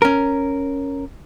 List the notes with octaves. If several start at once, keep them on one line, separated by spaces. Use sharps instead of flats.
C#4 A#4